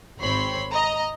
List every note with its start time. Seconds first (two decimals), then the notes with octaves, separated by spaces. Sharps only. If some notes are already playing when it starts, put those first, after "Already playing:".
0.19 G#1 C4 C#5 B5 C6
0.71 D#5 A#5